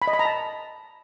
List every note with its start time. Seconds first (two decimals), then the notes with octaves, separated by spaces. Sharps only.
0.02 B5
0.07 D#5
0.13 B5
0.19 A#5
0.25 A5